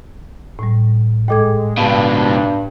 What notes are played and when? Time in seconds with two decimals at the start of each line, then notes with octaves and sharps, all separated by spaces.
0.59 A2 G3
1.28 G#2 G#3 A4 D#5 G5 D6 G#6
1.77 C#2 G2 B2 F5 A5 B5